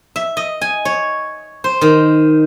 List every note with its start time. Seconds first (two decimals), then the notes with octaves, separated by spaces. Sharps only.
0.16 E5
0.37 D#5
0.61 G#5
0.85 C#5
1.64 C5
1.81 D#3